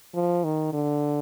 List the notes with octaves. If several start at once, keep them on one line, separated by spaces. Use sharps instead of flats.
F3
D#3
D3